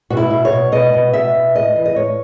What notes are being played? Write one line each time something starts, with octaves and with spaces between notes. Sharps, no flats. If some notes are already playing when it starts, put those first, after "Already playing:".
B2 F#4
E4
B2
C#5
B2
B2 D#5
B2
B2 E5
B2
A2 D#5
E3
D#5
A2 C#5